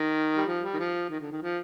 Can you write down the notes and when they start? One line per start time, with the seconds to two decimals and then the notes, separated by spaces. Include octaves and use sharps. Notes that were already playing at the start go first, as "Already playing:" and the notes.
Already playing: D#3
0.37 G3
0.46 F3
0.62 G3
0.74 D#3
0.79 F3
1.10 D#3
1.20 D3
1.31 D#3
1.42 F3